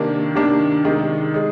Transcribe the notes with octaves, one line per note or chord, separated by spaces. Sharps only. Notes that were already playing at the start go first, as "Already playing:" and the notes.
Already playing: C3 D#3 A#3 D4
C3 D#3 A#3 D4
C3 D#3 G#3 D#4
G#3 D#4